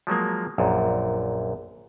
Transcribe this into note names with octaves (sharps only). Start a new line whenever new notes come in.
F3 F#3 G#3 A#3
A#1 F#2 A#2